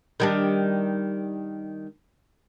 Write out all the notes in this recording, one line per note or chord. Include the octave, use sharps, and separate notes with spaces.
D#3 G3 D4